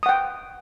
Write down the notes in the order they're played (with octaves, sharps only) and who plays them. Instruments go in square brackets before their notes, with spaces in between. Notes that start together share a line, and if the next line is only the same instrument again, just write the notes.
[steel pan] D#6
F#5
G5